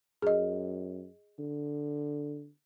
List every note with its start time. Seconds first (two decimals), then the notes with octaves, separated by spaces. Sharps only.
0.22 F#2 G#4 D#5
1.39 D3